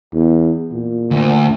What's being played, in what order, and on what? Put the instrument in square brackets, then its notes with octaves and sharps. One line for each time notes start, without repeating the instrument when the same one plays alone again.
[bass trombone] E2
A#2
[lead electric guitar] D2